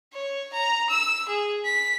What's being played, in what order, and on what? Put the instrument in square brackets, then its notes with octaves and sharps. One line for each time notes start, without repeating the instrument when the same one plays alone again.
[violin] C#5
A#5
E6
G#4
B6